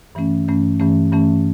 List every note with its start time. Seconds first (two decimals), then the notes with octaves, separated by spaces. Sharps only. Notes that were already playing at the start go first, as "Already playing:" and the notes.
0.15 G2 E3 A3 C#4
0.48 G2 E3 A3 C#4
0.80 G2 E3 A3 C#4
1.12 G2 E3 A3 C#4